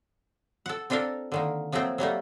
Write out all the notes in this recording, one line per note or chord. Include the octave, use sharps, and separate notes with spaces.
A4 F#5
C4 D4 F4 A4 A#4
D3 D#3 A#3
F3 F#3 A3 A#3 C4
F#3 G3 A3 A#3